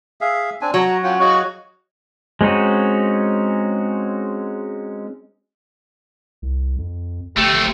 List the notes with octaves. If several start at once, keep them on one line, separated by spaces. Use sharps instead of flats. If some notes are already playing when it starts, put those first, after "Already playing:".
G#4 E5 F5
C4 D4 G#5
F#3 F#4 A#5
C#4 F4 F#5 G5
F#4 C#5 D#5 F5 C#6
G#3 C4 C#4 D#4 F#4
C2
F2
G1 A3 C4 G4